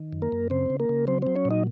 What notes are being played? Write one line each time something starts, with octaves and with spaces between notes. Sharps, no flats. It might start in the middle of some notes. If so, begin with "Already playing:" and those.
Already playing: D#3
F#2
A#3 A#4
F#2
C#3 C4 C5
C#3
A#3 A#4
C#3
F#3 C4 C5
F#3 C4 C5
C#4 C#5
A#2
D#4 D#5